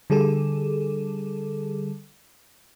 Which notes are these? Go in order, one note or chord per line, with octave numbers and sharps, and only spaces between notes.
D3 G3 G#4 A4